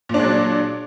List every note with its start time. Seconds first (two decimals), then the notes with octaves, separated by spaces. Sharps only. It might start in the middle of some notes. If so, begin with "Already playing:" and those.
0.09 A#2
0.14 D4
0.19 G#3
0.24 F#3